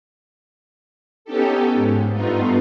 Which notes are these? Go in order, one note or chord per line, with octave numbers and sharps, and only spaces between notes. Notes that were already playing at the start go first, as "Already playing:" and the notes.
B3 C#4 D#4 G4 A4
G#2
G2 A3 B3 D#4 F4